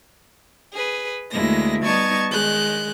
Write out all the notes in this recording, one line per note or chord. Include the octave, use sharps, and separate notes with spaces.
G#4 B4
D2 G#3 A#3 E4 A#6
G3 B3 D#4 A5 C#6 G#6
D#3 G#3 F#6 G6